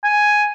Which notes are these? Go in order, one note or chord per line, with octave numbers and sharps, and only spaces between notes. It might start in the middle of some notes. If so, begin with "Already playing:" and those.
G#5